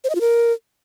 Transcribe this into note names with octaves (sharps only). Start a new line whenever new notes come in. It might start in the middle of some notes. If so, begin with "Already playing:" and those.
C5
D#5
F4
A#4